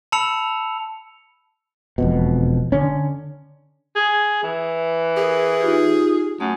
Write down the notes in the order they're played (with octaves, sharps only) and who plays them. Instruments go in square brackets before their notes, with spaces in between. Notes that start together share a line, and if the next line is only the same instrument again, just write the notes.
[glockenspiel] A5 B5 E6 C#7 F7
[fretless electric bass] E1 F2 B2
D3 C#4
[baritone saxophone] G#4
E3
[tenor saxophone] G#4 [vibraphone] A#4
[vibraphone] D#4 F4 G4
[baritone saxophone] F#2 [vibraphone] A3 F#4 D#6